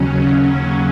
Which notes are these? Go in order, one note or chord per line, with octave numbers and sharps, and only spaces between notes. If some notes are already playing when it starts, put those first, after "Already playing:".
Already playing: D#2 C#3 F#3 C#4